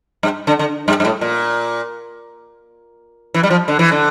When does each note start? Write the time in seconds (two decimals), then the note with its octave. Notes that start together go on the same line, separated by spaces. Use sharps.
0.23 G2
0.47 D3
0.59 D3
0.88 G2
1.00 G2
1.05 A2
1.21 A#2
3.34 E3
3.43 G3
3.50 F3
3.68 D3
3.79 E3
3.92 D3